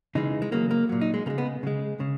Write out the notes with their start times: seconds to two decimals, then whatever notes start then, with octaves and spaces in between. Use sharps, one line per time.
0.15 C#3 E3 G#3 D#4
0.42 G#3
0.52 C#3 F#3 A#3
0.71 A#3
0.89 A#2 F#3
1.01 D#4
1.14 G#3
1.26 C#3 A#3
1.30 G#3
1.38 B3
1.63 C#3 G#3
2.00 C#3